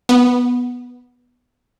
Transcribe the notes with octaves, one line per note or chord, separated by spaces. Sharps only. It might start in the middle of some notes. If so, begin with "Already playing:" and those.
B3